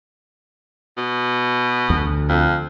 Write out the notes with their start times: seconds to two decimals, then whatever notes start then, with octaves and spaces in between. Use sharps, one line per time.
0.98 B2
1.90 D2
2.29 F2